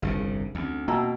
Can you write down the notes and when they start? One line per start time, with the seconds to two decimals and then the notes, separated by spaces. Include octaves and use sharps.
0.02 G1 C2 F2 C#3 D4
0.19 G#4
0.55 D2 C4 C#4
0.88 B2 A#3 G5 A5 A#5 E6